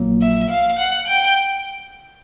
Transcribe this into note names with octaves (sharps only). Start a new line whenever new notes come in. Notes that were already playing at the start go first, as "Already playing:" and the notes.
Already playing: A#1 A#2 F#3 A#3
E5
F5
F#5
G5